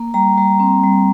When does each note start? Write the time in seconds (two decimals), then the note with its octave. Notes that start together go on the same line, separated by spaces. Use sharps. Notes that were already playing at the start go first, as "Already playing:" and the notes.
Already playing: A#3
0.14 G3 A#5
0.38 G3
0.60 C4
0.84 G3